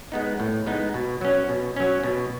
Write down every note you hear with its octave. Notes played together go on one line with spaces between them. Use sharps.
G#3 B3 D#4
A2
G#3 B3 D#4
B2
F#3 C#4
B2
F#3 C#4
B2